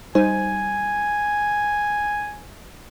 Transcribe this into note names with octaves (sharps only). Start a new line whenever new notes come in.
G3 D#4 C5 G#5